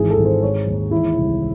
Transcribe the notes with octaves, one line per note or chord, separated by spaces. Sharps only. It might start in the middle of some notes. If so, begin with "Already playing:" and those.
Already playing: G#1 E3 G#4
A4
G#1
C5
G#3 C#5
D#2
E3 E4
C2